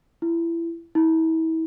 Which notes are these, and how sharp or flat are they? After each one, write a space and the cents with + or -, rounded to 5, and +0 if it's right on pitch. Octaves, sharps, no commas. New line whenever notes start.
E4 +25
E4 -35